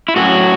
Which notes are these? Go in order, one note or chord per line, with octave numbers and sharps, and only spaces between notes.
E4
A2 F#3 C#4 F#4